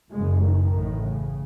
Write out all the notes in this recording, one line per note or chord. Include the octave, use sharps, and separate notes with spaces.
F#1 F#2 C#3 G#3
D#3
A1 A2
C#3